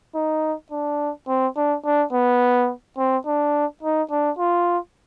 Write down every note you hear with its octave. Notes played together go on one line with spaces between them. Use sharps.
D#4
D4
C4
D4
D4
B3
C4
D4
D#4
D4
F4